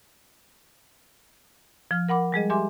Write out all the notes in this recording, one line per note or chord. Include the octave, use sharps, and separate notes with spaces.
F3 F6
A#4 F#5 B5 D6
G3 G#3 G#4 D#5
G4 E5 G#5 C6 D6